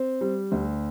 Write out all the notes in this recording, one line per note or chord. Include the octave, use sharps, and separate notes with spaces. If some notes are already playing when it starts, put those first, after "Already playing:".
Already playing: C4
G3
D2